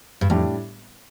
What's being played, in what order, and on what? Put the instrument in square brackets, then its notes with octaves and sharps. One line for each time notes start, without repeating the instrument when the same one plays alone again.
[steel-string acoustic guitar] G2
[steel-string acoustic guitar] F2 [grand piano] A2 G3 D4 G4